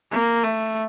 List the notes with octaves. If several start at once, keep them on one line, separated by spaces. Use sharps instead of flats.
A#3
A3